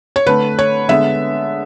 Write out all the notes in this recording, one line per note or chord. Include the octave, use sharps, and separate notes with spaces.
C#5
D3 A3 B4
C#5
D3 G#3 B3 E5